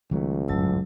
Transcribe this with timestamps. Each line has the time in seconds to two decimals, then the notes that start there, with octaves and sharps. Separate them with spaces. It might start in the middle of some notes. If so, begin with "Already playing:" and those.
0.11 C#2 D#3 F#3 A3
0.48 G1 F#2 A2 F#3 A5 E6